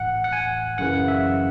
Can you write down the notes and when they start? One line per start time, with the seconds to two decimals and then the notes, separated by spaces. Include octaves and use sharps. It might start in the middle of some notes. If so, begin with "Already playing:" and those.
Already playing: A2 E3 F#5
0.24 F#5
0.33 G#5
0.78 F#2 C#3 E3 F#5
1.08 E5